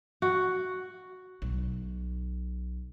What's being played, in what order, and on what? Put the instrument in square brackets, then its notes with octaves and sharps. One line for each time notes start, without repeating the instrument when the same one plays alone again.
[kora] F#4
[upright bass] B1